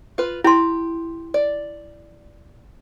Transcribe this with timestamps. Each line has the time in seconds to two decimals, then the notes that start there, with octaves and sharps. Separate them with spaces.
0.18 F4 B4
0.44 E4 G4 C6
1.34 D5